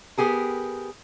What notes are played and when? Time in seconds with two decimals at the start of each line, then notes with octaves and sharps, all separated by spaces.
0.18 B3 G4 G#4 A#4